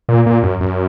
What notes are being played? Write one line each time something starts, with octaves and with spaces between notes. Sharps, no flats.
A#2
A#2
F#2
F#2